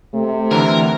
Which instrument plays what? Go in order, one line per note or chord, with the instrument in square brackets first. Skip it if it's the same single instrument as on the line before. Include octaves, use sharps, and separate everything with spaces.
[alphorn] C3 [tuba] A3
[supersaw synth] D3 E3 [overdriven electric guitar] A#4 A#5